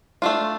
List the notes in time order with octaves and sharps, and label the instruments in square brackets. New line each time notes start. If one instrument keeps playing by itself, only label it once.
[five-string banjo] A3 D4 F4